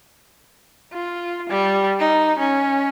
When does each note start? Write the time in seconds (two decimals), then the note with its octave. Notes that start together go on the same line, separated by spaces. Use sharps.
0.93 F4
1.50 G3
2.00 D#4
2.39 C#4